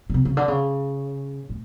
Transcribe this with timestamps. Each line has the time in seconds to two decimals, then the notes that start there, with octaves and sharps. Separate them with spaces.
0.10 C#3
0.14 C3
0.25 C#3
0.37 D3
0.48 C#3
1.50 A2